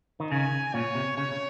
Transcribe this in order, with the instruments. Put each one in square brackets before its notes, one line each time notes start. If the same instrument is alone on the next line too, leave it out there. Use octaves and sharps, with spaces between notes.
[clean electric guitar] D#3
[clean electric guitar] C#3 [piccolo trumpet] G#5
[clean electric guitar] A#2 [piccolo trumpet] C#5
[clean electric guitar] C3
[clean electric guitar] C#3 [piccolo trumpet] C#5
[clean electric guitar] C#3